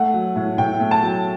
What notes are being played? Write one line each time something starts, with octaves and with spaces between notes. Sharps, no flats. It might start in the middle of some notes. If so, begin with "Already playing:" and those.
Already playing: A3 F#5
F#3
A2
A2 G5
A3
A5
F#3